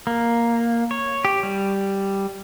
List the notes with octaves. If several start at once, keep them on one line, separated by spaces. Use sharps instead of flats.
A#3
C#5
G4
G3